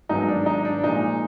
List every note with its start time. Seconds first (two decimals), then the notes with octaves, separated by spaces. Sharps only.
0.09 G#2 D#3 F#3 B3 D#4
0.28 D4
0.46 D#4
0.65 D4
0.84 A#2 F3 G#3 D#4